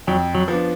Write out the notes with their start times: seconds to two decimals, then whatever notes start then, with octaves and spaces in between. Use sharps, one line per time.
0.07 F2 F#3
0.35 F#3
0.48 F3 B3 D4